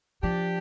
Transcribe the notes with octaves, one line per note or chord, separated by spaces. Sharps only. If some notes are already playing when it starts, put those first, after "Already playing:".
F3 D4 G4